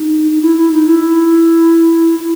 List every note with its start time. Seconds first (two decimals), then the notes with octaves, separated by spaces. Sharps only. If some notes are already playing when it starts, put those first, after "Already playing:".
Already playing: D#4
0.31 D#4
0.41 E4
0.57 E4
0.71 D#4
0.86 E4
2.19 E4